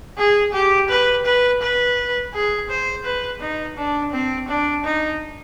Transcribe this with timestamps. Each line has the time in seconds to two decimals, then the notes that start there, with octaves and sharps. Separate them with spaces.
0.18 G#4
0.53 G4
0.89 B4
1.25 B4
1.62 B4
2.33 G#4
2.70 C5
3.05 B4
3.41 D#4
3.77 D4
4.13 C4
4.48 D4
4.84 D#4